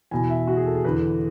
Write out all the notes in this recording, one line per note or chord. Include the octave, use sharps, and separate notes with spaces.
E2 B2 G#5
E5
F#4
G#4
A4
G#4
E2 D3 B4